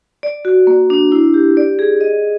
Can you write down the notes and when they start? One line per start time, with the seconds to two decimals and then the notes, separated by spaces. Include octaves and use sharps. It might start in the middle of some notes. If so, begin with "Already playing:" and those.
0.23 D5
0.45 F#4
0.67 A#3
0.90 D4
1.12 E4
1.34 G4
1.57 D5
1.79 G#4
2.01 D#5